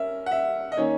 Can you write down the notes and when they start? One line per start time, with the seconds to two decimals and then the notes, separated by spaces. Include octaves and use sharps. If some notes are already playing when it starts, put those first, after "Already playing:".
Already playing: C#4 A#4 E5
0.26 F#5
0.31 E5
0.72 D#5
0.77 D#3 A#3 C#4 C#5